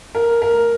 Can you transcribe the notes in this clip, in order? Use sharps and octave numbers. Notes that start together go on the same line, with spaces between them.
A#4
A#4